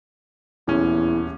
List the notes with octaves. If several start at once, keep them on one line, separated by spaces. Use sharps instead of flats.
D#1 E2 C#4